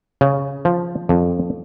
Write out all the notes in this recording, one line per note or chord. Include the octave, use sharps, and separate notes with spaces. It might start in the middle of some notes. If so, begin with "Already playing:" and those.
C#3
F3
F2